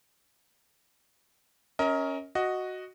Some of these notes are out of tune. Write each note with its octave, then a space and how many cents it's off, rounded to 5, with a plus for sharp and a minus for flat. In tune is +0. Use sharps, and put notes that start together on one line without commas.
C#4 +0 A#4 +0 D#5 +35
F#4 +0 D#5 +0